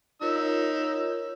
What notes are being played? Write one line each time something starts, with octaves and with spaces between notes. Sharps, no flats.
D#4 F4 A#4 C#5 E6